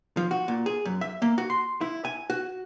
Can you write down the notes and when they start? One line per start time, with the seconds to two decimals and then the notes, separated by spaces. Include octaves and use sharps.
0.17 F3
0.31 F#4
0.48 A#2
0.66 G#4
0.85 F#2
1.01 E5
1.22 A#3
1.38 F#4
1.50 C6
1.81 E4
2.05 G#5
2.30 F#4